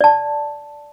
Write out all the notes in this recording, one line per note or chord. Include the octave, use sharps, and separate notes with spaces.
D5 A5